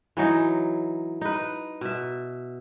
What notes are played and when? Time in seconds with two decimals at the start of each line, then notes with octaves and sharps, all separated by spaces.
0.17 E3 F#3 D#4
1.21 D#4 B4
1.81 B2 E5